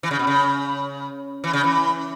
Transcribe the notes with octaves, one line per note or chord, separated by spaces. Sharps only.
E3
C#3
B2
C#3
E3
C#3
E3